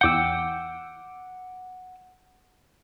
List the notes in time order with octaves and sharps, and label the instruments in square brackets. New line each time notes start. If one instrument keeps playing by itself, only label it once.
[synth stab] E2 G5 [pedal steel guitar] F#5 D6 E6